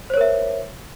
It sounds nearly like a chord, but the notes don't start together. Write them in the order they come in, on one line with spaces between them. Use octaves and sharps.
C5 C#5 A#4 E5